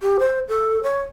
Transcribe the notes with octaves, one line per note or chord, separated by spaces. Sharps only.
G4
C5
A4
C#5